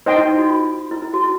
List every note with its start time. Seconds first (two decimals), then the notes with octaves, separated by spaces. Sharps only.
0.06 D#4 C5 D#5 G5
0.16 E4
0.28 D#4
0.38 F#4
0.49 F4
0.91 E4
1.02 E4
1.14 F#4
1.24 E4